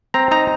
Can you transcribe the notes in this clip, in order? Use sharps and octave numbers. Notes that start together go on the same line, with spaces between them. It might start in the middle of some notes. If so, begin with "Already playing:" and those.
C4 A#5
D#4 A#5